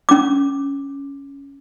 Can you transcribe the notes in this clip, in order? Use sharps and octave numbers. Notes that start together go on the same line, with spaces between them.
C#4 D6